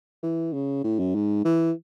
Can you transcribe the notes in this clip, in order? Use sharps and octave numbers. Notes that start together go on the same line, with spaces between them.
E3
C#3
A2
F#2
G#2
E3